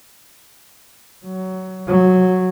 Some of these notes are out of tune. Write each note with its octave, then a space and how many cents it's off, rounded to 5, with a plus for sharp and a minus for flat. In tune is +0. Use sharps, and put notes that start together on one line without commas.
F#3 +20
F#3 -10